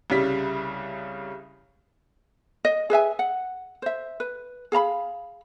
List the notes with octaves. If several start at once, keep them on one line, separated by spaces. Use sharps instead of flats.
C2 C#3 G3 B6
D#5
G#4 B4 E5 G#5
F#5
C5 E5
B4
G#4 F5 A#5 B5